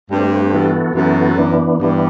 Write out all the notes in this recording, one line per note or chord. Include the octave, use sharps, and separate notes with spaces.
G2 A3 C4 G4
E3 B3 F#4 A4
F#2 E3 B3 F#4 A4
E3 B3 D4
G2 E3 B3 D4